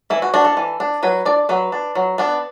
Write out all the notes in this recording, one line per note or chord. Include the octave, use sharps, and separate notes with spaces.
E3 E4
F#4
D4 F#4
A4
E3
D4
F#3 B4
D4 D5
F#3 B4
D4
F#3
B3 D4